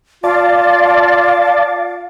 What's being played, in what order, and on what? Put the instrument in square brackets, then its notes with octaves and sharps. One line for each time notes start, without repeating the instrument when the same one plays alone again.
[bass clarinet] F4 [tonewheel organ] D5 A5 [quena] F5